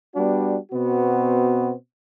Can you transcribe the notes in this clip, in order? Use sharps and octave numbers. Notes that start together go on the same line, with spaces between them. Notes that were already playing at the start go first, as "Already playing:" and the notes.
G3 B3 D4 F#4
B2 B3 C4 F#4